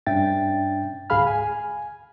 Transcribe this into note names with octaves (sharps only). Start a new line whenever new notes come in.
G2 C#4 D4 E5 G5 A6
D2 G#2 G#4 F5 B5 F6
G#5